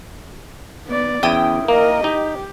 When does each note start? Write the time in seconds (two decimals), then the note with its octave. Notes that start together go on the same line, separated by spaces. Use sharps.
0.87 B3 D5
1.23 E2 C#4 E4 G5 D#6
1.68 A#3 A#4 D#5
2.04 D#4 G4